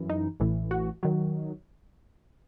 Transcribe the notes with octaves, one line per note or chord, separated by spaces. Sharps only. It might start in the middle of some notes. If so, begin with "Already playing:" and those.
Already playing: F#2 E3
D#4
A1 A2 E3
F#4
D#3 F#3